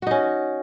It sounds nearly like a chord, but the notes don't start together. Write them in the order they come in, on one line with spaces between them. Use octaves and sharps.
F#4 D#4 C#4